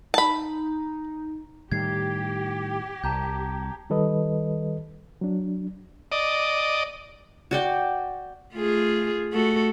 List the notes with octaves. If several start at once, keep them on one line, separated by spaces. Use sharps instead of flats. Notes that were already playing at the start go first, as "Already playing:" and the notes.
D#4 A5 B5
A2 D#3 G3 G4 G#6 C7
C2 A5 A#5 G6
D#3 G3 A4 B4 D#5
F#3 D4
D5 D#5
F#4 D5 G5
A3 F4 G#4
A3 F#4 A4